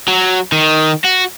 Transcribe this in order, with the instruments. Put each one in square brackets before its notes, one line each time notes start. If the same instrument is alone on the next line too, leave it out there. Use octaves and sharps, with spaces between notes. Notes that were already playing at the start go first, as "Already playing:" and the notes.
[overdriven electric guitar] F#3
D#3
F#4